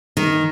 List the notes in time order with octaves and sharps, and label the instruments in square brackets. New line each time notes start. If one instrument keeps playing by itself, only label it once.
[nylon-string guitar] D#3